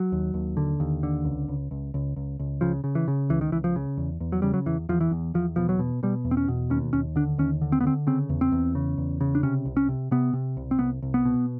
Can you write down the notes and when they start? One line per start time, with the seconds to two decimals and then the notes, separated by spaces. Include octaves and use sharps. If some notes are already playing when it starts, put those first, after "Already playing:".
Already playing: F#3
0.12 D#2
0.34 D#2
0.57 D3
0.80 D#2
1.03 D3
1.25 C#2
1.48 C#2
1.71 C#2
1.94 C#2
2.16 C#2
2.39 C#2
2.61 C#3 F3
2.84 C#3
2.95 E3
3.08 C#3
3.29 C#2 E3
3.41 D#3
3.52 C#2 E3
3.64 F3
3.76 C#3
3.97 E2
4.20 E2
4.32 F#3
4.42 C#3 G3
4.54 F#3
4.66 E2 E3
4.89 E2 F3
5.01 E3
5.11 E2
5.34 E2 F3
5.56 B2 F3
5.69 F#3
5.79 B2
6.03 B2 G3
6.25 E2
6.31 C4
6.37 C#4
6.48 B2
6.70 D#2 C#4
6.93 D#2 C#4
7.16 D3 D4
7.38 D#2 C#4
7.61 D3
7.72 C4
7.81 B3
7.84 D3 C4
8.07 C#3 C4
8.29 E2
8.41 C4
8.52 E2
8.75 C#3
8.98 E2
9.21 C#3
9.35 D4
9.43 C3 C#4
9.65 C2
9.77 C#4
9.89 C3
10.11 C3 B3
10.33 C3
10.57 C2
10.71 C4
10.79 C2 B3
11.02 C2
11.14 B3
11.25 B2